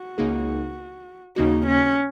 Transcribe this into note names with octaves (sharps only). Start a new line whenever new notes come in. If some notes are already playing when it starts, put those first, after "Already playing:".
Already playing: F#4
C#2 C#3 A#3 D#4 G#4
D#2 C#3 A#3 D#4 F#4
C#4